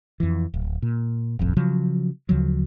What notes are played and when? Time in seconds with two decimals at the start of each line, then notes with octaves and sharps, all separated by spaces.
0.20 F2 E3
0.54 D1
0.82 A#2
1.39 D#1 A1 F2
1.57 C#3 F3 F#3
2.29 D2 C#3 F3 F#3